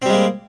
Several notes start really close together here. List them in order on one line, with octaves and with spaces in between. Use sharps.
C4 G3 G#3 A#3